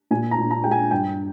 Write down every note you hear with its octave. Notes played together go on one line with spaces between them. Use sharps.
A#2 G#5
A#5
A#2
A#5
G#3 G5
G#5
G2 G5